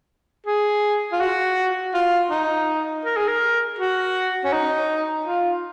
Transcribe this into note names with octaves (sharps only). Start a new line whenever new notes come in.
G#4
F4
F#4
F4
D#4
A#4
G#4
A#4
F#4
C#4
D#4
F4